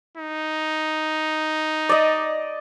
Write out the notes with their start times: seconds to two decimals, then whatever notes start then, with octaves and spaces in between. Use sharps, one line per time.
0.18 D#4
1.89 D5 D#5